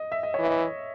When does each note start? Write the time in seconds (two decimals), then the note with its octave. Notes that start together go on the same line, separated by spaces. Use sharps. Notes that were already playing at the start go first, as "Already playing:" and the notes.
Already playing: D#5
0.12 E5
0.23 D#5
0.34 C#5
0.39 E3
0.46 D#5